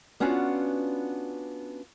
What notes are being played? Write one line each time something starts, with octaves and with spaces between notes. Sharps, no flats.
B3 C#4 D4 F4 F#4